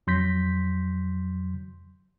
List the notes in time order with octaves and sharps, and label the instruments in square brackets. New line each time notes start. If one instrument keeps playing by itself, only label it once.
[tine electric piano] F2 F#3 C6 G6 A#6 B6